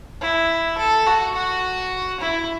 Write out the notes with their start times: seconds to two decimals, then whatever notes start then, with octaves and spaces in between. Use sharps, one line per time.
0.21 E4
0.78 A4
1.07 F#4
1.35 F#4
2.20 E4